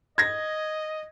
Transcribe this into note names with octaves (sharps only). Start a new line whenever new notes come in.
D#5 G#6 A#6